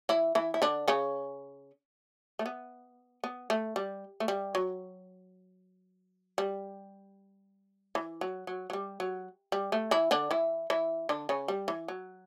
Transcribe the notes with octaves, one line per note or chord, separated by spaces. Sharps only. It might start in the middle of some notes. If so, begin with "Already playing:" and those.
E3 E4
E3 E4
E4
D3 D4
C#3 C#4
A3
B3
B3
A3
G3
A3
G3
F#3
G3
E3
F#3
F#3
F#3
G3
F#3
G3
A3
E3 E4
D3 D4
E3 E4
E3 E4
D3 D4
C#3 C#4
G3
E3
F#3